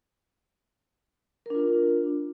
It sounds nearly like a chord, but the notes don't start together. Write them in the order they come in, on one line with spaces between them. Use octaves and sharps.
A#4 D4 F4